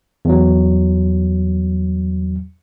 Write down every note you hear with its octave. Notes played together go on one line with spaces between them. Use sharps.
E2 F#3